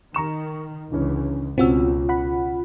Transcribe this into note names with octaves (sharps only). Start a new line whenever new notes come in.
D#3 A#5 C#6 E7
C#2 D3 E3 C#4
C#2 B2 C4 C#4 F4 F#4 E6
F#5 B5